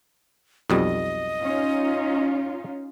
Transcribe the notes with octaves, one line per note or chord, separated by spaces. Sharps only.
B1 F2 G3 D#5
C#4 D#4 F4